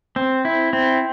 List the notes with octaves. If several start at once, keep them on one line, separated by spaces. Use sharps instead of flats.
C4
E4
C4